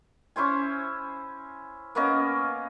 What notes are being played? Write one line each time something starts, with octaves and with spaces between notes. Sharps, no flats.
C#4 E4 C5 G#5
A#3 B3 C#4 D#5